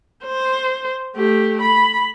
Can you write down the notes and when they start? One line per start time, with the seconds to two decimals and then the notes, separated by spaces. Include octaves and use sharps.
0.25 C5
1.15 A3 G4
1.62 B5